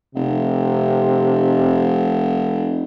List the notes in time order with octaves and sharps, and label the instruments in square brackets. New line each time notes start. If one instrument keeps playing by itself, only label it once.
[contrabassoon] F1 [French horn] C3